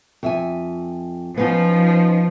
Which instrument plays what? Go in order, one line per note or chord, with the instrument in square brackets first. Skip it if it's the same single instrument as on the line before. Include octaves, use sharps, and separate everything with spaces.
[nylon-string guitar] F2 E5 G#5
[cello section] F3 [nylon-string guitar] B3 C#4 D#4